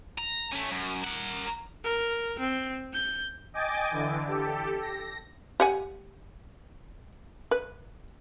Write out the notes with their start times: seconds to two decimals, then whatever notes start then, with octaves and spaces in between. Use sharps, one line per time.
0.18 A#5
0.52 A3 C#4
0.71 F#2
1.04 A#4 F#5
1.84 A#4
2.40 C4
2.93 G6
3.54 D#5 G5 G#5 D6 A6 D7
3.91 D3 E3
4.28 G4 A4
4.81 A#6
5.60 G4 F#5 G#5
7.51 B4